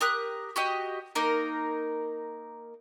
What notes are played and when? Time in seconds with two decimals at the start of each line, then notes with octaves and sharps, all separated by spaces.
0.01 G4 A#4 D#6 F#6
0.56 F#4 G4 D#5
1.15 A#3 D#4 A#4